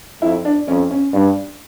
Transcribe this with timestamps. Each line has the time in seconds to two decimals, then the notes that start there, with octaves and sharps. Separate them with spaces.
0.22 F2 E4
0.45 D4
0.67 F2 C#4
0.91 C#4
1.13 G2 D4